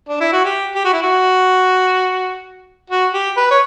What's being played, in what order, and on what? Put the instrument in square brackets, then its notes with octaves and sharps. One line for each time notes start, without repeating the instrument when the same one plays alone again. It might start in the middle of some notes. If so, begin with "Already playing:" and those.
[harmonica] D4
E4
F#4
G4
G4
F#4
E4
F#4
F#4
G4
B4
C#5